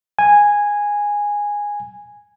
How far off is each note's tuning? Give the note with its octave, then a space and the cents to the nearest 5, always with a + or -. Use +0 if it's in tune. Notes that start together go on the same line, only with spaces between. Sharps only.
G#5 -10